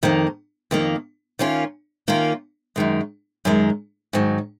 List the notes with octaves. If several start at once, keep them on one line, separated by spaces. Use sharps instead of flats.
F2 D#3 A#3
F2 D#3 A#3
D#3 A#3 C#4 F4
D#3 A#3 C#4 F4
F#2 D#3 G#3
F#2 D#3 G#3
G#2 D#3 F#3